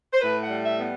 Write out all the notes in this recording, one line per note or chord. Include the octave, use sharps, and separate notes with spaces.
C5
A2 B4
F#5
G3
E5
B3